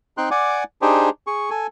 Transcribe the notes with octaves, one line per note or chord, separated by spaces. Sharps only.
C4 D#4 G5 C6 F#6
D5 F#5 G#5 D6
D4 D#4 G4 G#4 C5
G#4 C#6
A4 G#5